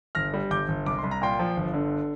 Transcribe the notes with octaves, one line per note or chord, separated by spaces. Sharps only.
G1 F6 A#6
G3
G1 D6 G6
G1
C2 D6
C2 C6
A#5
A#2 G5 C6
F3
G1
D3